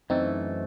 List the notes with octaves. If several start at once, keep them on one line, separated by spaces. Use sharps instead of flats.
F#2 E3 A3 C4 D#4